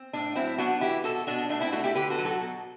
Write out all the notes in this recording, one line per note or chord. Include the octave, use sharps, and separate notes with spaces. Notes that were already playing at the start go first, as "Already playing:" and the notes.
Already playing: C4
A2 D4
F#3 C4 E4
B3 D4 F#4
E3 E4 G4
B2 F#4 A4
B2 D4 F#4
A3 D4
C4 E4
A3 D4 F#4
E4 G4
D3 G4 B4
F#4 A4
F#3
F#4 A4
B2